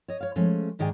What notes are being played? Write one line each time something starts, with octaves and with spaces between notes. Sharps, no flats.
C#5 D#5
C#5 F5
F3 G#3 A3 C#4
G#2 D#3 G#4 D5 G5 G#5